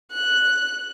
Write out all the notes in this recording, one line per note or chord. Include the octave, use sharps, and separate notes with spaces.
F#6